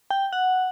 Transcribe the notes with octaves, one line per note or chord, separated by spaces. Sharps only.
G5
F#5